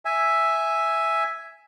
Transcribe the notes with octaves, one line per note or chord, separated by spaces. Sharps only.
E5 G#5